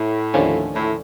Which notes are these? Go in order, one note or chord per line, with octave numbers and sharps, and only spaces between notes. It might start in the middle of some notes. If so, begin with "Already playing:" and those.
Already playing: A2
D#2 D3 F3 A3 C#4
A2